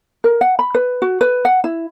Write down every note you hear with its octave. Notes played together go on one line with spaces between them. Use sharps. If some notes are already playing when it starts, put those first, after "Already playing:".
A#4
F#5
B5
B4
F#4
B4
F#5
E4